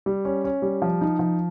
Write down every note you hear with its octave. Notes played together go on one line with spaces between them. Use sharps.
G3
C#4
C#4
G3
F3
D#4
F3